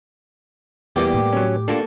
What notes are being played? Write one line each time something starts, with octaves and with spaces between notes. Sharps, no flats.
E2 G3 A#3 B3 G4
A2
F#3 C#4
A#3 D4 F4 F#4 A4 A5